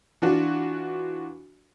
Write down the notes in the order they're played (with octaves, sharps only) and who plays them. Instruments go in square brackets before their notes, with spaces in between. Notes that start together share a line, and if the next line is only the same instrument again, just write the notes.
[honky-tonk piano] E3 D4 F4 F#4